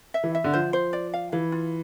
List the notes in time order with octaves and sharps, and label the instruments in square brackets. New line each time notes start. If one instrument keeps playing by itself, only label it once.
[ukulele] E5
[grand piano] E3
[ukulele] E5
[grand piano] D3
[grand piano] F3 [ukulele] C5
[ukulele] C5
D5
F5
[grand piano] E3 [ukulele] F5
[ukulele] F4